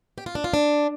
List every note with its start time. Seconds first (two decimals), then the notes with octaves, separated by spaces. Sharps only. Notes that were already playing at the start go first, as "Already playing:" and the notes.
0.18 G4
0.26 F4
0.35 D4
0.44 F4
0.54 D4